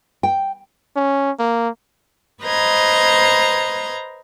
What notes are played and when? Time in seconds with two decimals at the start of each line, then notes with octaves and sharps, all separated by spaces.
0.23 G5
0.96 C#4
1.39 A#3
2.44 B4 C5 D#5 A#5 G#6